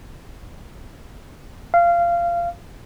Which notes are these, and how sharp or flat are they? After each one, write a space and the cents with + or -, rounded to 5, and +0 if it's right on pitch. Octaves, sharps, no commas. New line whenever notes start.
F5 -20